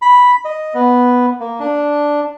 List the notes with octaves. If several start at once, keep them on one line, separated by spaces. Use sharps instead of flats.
B5
D#5
B3
A#3
D4